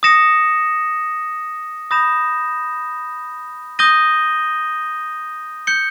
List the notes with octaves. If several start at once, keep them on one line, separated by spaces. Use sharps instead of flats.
D#6 A#6 C#7 E7
B5 D#6 G6 A#6 E7
D#6 G6 A#6 D#7 G7
G6 C#7 G7